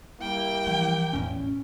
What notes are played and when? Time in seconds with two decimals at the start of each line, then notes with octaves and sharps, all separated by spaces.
0.21 G3 A#3 E4 G5
0.66 E3 F3
1.13 A1 E2 C#4